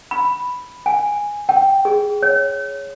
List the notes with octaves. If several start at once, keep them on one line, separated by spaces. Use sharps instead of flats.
B5
G#5
G5
G#4
C#5